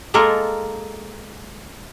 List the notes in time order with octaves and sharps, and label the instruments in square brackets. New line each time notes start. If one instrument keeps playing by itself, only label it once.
[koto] G#3 A#3 F4 A4 A#4